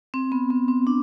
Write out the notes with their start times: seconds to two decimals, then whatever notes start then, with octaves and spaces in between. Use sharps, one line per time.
0.14 C4
0.32 B3
0.50 B3
0.68 C4
0.87 D4